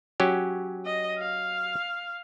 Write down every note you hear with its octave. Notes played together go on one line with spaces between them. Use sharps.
F#3 C#4 G4
D#5
F5